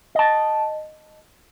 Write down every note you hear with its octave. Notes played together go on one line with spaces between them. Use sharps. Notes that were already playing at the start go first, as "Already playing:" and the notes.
D#5 A5